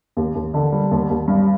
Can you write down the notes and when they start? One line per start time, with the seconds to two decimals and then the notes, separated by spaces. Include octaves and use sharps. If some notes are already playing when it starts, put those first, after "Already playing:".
0.17 D#2
0.35 D#2
0.54 D3
0.72 G3
0.91 D#2
1.09 D#2
1.28 G2